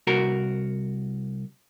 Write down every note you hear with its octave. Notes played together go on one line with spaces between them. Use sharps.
C2 F#4 A#4